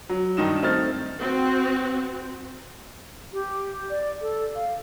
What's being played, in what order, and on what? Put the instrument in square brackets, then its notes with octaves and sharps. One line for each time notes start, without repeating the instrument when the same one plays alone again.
[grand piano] F#3
G2 D#3 D#4 E7
A3 C4 D#4 F6 A6
[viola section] C4 F#4
[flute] G4
D5
A4
F5